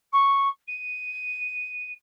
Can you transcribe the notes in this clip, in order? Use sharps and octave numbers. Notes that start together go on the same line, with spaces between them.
C#6
D#7